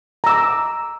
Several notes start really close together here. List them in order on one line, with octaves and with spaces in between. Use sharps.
A#5 E6 D6